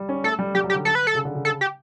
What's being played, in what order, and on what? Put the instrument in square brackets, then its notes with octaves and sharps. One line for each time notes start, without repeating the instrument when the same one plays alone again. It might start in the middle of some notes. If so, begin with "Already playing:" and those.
Already playing: [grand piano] G3
C#4
[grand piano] A3 [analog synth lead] A4
[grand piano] G3
[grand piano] G3 [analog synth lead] G4
[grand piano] F#3
[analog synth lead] G4
[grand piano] D3
[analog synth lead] A4
B4
A4
[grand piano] C#3
D3
C#3
[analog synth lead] A4
G4